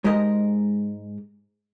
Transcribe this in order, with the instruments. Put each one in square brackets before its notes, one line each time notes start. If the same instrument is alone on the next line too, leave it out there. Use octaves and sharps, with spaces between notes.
[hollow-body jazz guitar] G#2 G#3 G4 A#4 D#5